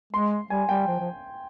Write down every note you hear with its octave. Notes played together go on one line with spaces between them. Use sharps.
G#3 C6
G3 G#5
G3 G5
F3
F3